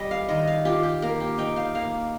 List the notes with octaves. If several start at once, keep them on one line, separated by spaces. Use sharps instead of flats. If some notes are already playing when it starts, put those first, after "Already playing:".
Already playing: G3 D#5
F5
D#3 D#5
F5
F4 G4
G4
A#3 A#4
G4
D#4 G5
F5
A#3 F5